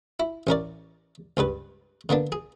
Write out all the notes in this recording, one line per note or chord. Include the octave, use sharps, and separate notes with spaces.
E4
A1 C#4 A#4 D5
C#2 G2 G3 B4
D3 A#3 B3 D4
G#4